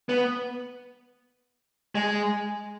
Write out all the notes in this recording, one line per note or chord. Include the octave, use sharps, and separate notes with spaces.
B3
G#3